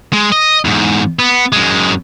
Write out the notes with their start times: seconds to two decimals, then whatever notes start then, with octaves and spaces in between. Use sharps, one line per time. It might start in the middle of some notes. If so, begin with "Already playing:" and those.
0.13 G#3
0.32 D#5
0.65 E2 G#2
1.19 B3
1.53 F#2 G#3